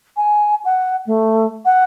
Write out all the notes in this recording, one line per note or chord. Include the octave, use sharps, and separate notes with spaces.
G#5
F#5
A3
F#5